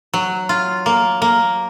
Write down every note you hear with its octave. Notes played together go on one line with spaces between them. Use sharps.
F#3
F4
A#3
A#3